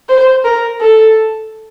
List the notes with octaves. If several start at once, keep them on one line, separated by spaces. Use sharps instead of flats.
C5
A#4
A4